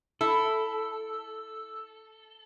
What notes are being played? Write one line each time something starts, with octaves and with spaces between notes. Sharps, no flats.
E4 A4 E6